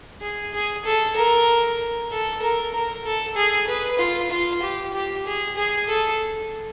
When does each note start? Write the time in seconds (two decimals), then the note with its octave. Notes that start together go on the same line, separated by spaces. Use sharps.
0.22 G#4
0.54 G#4
0.85 A4
1.16 A#4
2.11 A4
2.43 A#4
2.74 A#4
3.05 A4
3.36 G#4
3.68 B4
3.99 F4
4.31 F4
4.63 G4
4.94 G4
5.26 G#4
5.56 G#4
5.89 A4